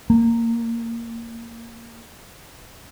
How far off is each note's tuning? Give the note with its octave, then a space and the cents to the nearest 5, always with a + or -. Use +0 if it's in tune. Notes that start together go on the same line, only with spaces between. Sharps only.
A#3 -15